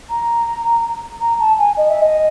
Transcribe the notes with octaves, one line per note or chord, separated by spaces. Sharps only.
A#5
A#5
A5
G#5
D#5
E5
D#5